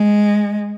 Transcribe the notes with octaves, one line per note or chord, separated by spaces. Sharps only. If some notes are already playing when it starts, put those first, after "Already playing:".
Already playing: G#3